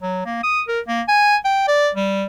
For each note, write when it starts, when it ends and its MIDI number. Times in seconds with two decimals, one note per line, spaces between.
0.02 0.21 54
0.26 0.39 58
0.43 0.61 87
0.68 0.80 70
0.87 1.02 58
1.08 1.36 80
1.44 1.65 79
1.67 1.89 74
1.95 2.25 55